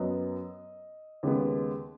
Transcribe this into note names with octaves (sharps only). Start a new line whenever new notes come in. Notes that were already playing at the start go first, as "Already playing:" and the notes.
Already playing: F#2 F#3 B3 D#5
D#2 C#3 G#3 B3